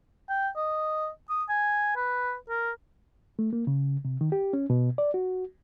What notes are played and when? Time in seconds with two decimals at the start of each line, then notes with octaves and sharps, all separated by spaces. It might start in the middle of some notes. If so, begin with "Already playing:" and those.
0.29 G5
0.56 D#5
1.29 D#6
1.49 G#5
1.96 B4
2.49 A#4
3.39 A3
3.53 A#3
3.67 C#3
4.05 C3
4.21 D#3
4.32 G4
4.53 C#4
4.70 B2
4.98 D5
5.14 F#4